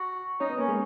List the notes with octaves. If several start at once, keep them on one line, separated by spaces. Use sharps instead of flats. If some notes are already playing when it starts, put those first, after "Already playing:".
Already playing: F#4
C#4 D#4 C#5
B3 B4
A#3 C#4 A#4
G#3 G#4